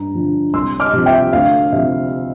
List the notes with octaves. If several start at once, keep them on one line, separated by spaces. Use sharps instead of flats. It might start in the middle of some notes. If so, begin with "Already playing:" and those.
Already playing: G2 A#5
D3 F3
C2 C6 E6
D6 F6
C3 F3
E5 G5
D2 F5
C3 F3 E5